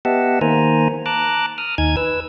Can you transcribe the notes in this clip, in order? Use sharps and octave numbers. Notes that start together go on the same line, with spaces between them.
B3 G4 D#5 E5 F#5 A5
D#3 A#3 C5 G#5 A#5
A5 A#5 D6 F#6
D#6 F6
D#2 D#4 G#5 G#6
B4 E6